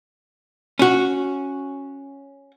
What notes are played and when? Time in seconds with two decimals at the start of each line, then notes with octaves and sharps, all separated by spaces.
0.79 C#4 F#4